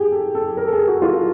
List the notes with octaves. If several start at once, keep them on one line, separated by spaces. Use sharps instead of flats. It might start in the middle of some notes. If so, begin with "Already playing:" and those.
Already playing: G4 G#4
A4
A4
A#4
A4
G#4
F#4
F4